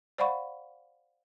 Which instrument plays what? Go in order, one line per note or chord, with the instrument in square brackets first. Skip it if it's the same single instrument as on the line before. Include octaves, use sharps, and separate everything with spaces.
[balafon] C5 D5 F5 F#5 B5 C#6